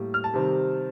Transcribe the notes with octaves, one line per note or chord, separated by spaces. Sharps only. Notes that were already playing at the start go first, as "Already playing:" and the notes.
Already playing: A2 G3 A#3
F6
A5
C3 D#3 G3 C4